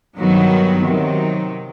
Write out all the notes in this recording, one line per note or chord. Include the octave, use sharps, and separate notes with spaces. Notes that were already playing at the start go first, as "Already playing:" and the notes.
G2 D#3 F#3 B3 F#4
C3 D#3 F#3